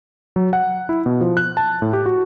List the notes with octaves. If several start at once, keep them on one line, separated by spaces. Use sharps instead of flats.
F#3
F#5
E4
B2
F3
F#6
A5
A2
G4
F#4